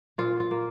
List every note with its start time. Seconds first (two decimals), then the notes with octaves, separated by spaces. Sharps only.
0.18 A#2 F4
0.40 F4
0.51 A#3